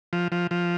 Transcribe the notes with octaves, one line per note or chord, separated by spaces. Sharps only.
F3
F3
F3